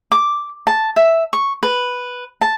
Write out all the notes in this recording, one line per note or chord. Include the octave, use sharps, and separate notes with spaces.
D6
A5
E5
C#6
B4
A5